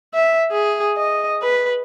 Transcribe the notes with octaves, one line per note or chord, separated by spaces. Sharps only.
E5
G#4
D#5
B4